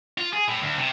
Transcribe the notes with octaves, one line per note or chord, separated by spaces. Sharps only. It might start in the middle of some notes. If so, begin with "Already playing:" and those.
F4
G#4
A2
D2
C3